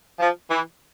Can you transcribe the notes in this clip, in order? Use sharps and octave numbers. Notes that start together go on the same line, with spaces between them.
F3
E3